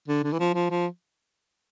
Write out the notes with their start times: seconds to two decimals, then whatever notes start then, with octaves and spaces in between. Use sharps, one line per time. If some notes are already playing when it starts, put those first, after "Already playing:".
0.08 D3
0.24 D3
0.33 E3
0.40 F3
0.54 F3
0.70 F3